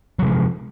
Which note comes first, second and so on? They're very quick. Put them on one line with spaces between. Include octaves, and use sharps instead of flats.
F#3 C3 G#3 F3